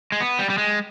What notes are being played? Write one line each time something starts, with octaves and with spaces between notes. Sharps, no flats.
G#3
B3
G3
G3
G#3